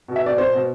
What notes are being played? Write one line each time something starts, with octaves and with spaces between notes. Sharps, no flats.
B2
E5
B2 D5
B2 C5
B2